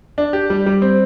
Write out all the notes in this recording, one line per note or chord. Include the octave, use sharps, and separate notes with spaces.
D4
G4
G3
G3
C4